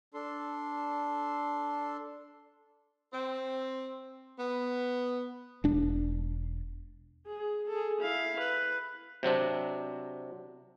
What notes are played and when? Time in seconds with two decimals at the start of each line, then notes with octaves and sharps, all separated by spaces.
0.14 D4 A4 C6
3.13 C4
4.39 B3
5.64 E1 D4
7.26 G#4
7.69 G#4 A4
8.00 E4 F5
8.39 B4
9.23 C3 F#3 C4 D4